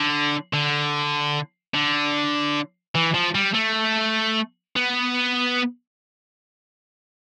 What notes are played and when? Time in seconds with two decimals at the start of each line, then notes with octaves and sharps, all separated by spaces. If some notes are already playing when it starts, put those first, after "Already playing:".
Already playing: D3
0.53 D3
1.74 D3
2.95 E3
3.14 F3
3.35 G3
3.54 A3
4.76 B3